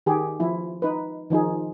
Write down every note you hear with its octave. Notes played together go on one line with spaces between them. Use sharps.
D#3 G4 G#4
F3 E4
D#4 B4
D#3 F3 D#4 G#4